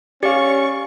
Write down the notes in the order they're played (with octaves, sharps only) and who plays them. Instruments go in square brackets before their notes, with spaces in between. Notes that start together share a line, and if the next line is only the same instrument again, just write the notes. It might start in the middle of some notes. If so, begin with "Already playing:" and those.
[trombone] C#4 [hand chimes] G4 [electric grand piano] D5 F5 [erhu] C#6